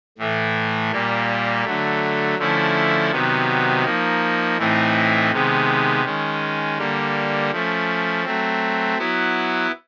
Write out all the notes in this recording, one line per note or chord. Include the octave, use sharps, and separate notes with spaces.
A2 E3 A3
A#2 G3 A#3
D3 F#3 A3
D3 F3 A3 C#4 E4
C3 D#3 F#3 B3
F3 A#3 D#4
A2 E3 A3 C4 D#4
C3 D#3 G#3 B3
D#3 G#3 C#4
D3 G3 A#3
F3 A3 C#4
F#3 A3 C4
F#3 B3 E4